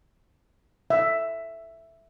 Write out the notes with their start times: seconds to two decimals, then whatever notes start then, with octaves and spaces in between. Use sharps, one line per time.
0.90 E5